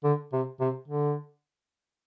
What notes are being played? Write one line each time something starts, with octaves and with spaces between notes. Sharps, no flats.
D3
C3
C3
D3